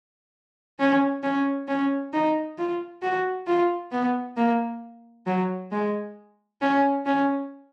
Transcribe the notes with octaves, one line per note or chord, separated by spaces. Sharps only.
C#4
C#4
C#4
D#4
F4
F#4
F4
B3
A#3
F#3
G#3
C#4
C#4